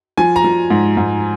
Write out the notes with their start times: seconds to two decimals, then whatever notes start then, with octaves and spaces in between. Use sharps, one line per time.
0.17 F3 G#5
0.36 A#5
0.44 F3
0.70 G#2
0.97 G#2